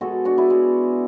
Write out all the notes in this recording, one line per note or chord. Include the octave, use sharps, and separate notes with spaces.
B2 G#3 F#4 A4
D4 F#4
E4 G#4
B2 G#3